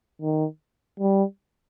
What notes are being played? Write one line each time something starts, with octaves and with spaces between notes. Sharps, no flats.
D#3
G3